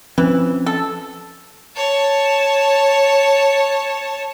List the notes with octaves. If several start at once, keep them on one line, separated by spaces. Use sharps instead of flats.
E3 F3 C4 C#4
A4
C#5 A5